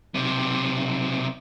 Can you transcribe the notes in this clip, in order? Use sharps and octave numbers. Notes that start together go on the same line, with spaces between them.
B1 C3